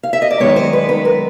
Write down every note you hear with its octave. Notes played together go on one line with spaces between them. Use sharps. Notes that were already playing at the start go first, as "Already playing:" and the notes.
F5
E5
D#5
D5
F#2 D#3 G#3 B3 C#5
C5
B4
F#2 D#3 G#3 B3 B4
A#4